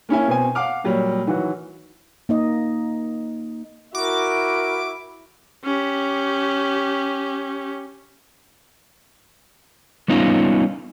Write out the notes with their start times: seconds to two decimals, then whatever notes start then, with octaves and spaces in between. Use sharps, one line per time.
0.09 A#3 C#4 E4 G#5
0.28 B2 C4 G#5
0.55 F5 F#5 D6 F6
0.84 A#2 F#3 G3
1.27 D#3 E3 F#3 F#4
2.29 A#3 D#4 D#5
3.95 E4 F#4 A#4 D6
5.65 C#4 G4
10.08 G3 B3 C#4 D#4 F4